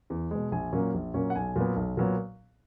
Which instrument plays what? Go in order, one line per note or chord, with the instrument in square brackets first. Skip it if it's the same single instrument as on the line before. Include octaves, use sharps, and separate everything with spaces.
[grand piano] E2
B2 G#3
A#1 G#5
A#2 F#3 A#3 C#4
A#1
A#2 F#3 A#3 C#4
F#5
B1 G#5
A#2 F#3 B3
B1
A#2 F#3 B3